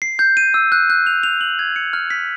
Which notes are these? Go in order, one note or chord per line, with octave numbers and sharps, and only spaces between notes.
C7
G6
D#7
E6
F#6
F#6
F7
F7
F#7
G#6
C#7
F6
B6